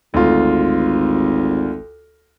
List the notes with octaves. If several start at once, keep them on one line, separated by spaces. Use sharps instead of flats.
G#1 D2 F4